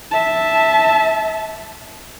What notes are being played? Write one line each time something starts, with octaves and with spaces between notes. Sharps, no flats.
E5 A5